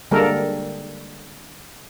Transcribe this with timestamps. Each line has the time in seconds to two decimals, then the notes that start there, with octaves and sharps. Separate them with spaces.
0.11 D3 G3 G#3 A#3 A4 A#4